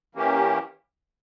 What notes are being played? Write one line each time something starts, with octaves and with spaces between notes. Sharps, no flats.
E3 A#3 C#4 G4